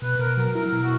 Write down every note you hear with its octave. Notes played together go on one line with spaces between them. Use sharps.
B2 B4
B2 A#4
F#3 A#4
E4 A#4
A#4
B2
F#4